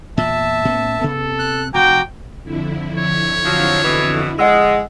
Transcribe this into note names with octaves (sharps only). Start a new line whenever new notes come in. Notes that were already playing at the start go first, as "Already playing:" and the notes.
E2 A#2 E5 A5
A2 B3 C#4
C3 B3 A4
F#6
F1 F#4 G5 A#5 D6
F2 D3 E4
C#5
F3 F#3
B2 E3
G#3 D#5 F#5 E6